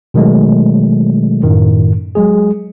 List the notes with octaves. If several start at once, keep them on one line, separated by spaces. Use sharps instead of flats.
B2 D#3 F#3 G#3 A3
F#2 A2 D#3
F#3 G#3 G#4